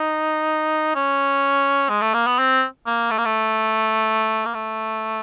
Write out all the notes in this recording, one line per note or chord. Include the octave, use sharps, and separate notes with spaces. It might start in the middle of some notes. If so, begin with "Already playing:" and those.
Already playing: D#4
C#4
G#3
A3
A#3
B3
C4
A#3
A3
A#3
A3
A#3
A3